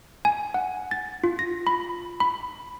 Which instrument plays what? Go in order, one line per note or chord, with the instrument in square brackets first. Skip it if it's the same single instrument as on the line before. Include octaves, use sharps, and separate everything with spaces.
[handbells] G#5
F#5
A6
F4
A#6
B5
B5